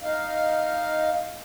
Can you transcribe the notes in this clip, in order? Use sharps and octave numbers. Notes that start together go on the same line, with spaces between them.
D#4 F5